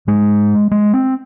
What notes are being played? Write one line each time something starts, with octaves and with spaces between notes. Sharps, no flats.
G#2 G#3
G#3
C4